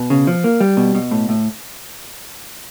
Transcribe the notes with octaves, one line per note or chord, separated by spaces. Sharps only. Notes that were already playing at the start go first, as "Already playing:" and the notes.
Already playing: B2
C#3
F3
A#3
G3
B2
B2
A2
A2